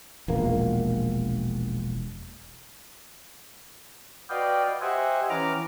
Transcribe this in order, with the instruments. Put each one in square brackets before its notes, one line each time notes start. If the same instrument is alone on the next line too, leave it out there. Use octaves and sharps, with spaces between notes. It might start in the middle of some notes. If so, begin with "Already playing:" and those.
[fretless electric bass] E1 A#1 A#3
[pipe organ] F#4 B4 D5 D#5 F5 G5
G4 C5 D#5 E5 F#5 G#5
E3 C#4 B4 A#5 D6 F6